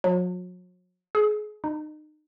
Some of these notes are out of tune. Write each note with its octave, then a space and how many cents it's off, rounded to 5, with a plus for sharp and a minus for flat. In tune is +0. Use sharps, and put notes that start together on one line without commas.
F#3 -40
G#4 +30
D#4 -30